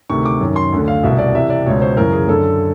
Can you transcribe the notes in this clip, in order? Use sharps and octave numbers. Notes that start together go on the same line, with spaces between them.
D2 C3 D#3 C#6
D6
F#2 D#3
C6
D2 D3
F5
C2 B2 E5
D5
C2 C3 E3 E5
D5
C#2 B2 C#5
C5
F#2 C#3 E3 A#4
G#4
F#2 D3 A4